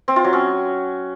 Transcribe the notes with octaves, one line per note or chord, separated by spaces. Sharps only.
C4
F4
F#3
C#4